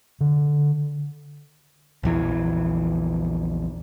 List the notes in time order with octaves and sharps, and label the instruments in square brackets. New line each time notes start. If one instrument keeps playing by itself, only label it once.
[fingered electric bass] D3
A#1 E2 E3